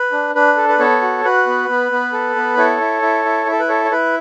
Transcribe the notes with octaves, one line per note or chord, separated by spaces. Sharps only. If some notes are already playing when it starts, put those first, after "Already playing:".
Already playing: B4
D4
D4 B4
A4
B4
B3 A4 C#5
F#4
F#4 B4
B3
B3
B3
A4
B3
E4 A4 C#5
E4
E4
E4
E4
A4
B4
A4 C#5
C#5
E4 B4